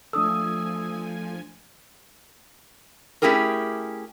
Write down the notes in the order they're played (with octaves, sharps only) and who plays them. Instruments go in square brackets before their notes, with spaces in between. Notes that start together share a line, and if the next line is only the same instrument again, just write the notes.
[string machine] F3 G#5 [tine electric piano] A3 D4 A4 [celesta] D#6 E6
[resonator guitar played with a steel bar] A3 C#4 E4 G4 G#4 A#4